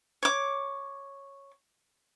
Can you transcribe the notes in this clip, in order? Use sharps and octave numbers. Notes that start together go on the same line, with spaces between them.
C#5 D6